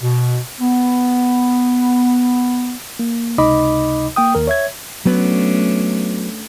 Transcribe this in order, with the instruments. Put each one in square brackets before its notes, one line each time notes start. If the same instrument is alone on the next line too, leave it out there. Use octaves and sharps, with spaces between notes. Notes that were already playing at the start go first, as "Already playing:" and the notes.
[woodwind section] B2
B3
[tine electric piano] A#3
C#2 C3 D#4 D#5 B5 D6
A#3 G5 D#6
D#2 A#4
C#5 E5 G#6
[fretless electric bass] F#3 B3 [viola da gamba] A3 C#4 D4